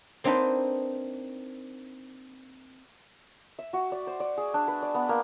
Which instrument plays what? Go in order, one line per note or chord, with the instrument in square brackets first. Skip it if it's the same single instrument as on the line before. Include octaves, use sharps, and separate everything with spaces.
[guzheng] A#3 C4 D4 D#4 B4 C5
[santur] E5
F#4
D5
C5
D5
G#4
D4
B4
D5
B3
A#3